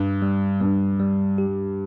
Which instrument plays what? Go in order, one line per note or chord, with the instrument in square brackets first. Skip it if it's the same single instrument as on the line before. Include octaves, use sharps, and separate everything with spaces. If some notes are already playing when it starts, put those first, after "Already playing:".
Already playing: [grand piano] G2 [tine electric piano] G3
[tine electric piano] G3
[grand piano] G2 [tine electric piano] G3
[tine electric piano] G3
G4